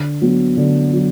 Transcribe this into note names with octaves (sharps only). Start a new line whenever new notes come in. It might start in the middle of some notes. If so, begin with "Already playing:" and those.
Already playing: D3
F#3 B3
D3
F#3